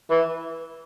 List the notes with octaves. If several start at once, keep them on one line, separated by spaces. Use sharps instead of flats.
E3